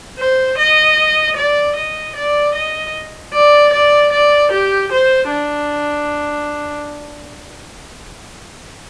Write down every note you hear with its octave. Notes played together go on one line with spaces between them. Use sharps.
C5
D#5
D5
D#5
D5
D#5
D5
D5
D5
G4
C5
D4